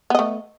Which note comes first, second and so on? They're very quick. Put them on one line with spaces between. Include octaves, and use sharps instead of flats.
B3 D#5 A3